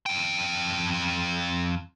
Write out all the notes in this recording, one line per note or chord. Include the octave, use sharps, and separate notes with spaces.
F2 G5